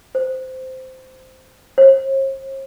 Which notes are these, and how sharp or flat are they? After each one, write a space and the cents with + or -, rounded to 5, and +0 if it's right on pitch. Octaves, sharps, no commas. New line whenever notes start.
C5 -10
C5 +45